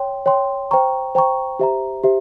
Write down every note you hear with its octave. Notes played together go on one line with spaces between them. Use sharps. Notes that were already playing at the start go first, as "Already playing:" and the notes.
Already playing: C#5 G5 C6
C#5 G5 C6
C5 G5 A#5 C#6
C5 G5 A#5 C#6
G4 C5 E5 A#5
G4 C5 E5